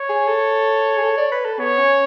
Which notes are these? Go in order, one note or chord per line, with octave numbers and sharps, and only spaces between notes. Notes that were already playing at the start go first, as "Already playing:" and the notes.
Already playing: C#5
G#4
A4
G#4
A4
D5
B4
A4
B3 C#5
C#4